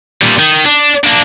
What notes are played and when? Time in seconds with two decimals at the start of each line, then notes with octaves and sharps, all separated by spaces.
0.21 A#2 G3
0.39 D#3
0.66 D4
1.04 A#3 D4